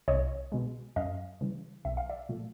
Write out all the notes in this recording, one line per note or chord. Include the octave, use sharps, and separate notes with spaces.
C2 C#5 D#5
B2 G#3
F#2 D#5 F5
C#3 E3 G3
B1 E5
F5
D5 E5
A#2 F3 A3